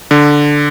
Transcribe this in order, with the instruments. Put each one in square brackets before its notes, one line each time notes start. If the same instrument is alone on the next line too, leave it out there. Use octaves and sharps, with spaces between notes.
[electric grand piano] D3